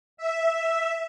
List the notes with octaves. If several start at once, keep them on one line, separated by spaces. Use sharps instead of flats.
E5